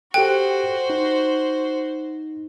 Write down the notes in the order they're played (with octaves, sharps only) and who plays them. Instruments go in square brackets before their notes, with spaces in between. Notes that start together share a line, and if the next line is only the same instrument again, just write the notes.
[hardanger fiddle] F#4 C5 [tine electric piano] G4 A4 F#6 [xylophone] G5
[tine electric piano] D#4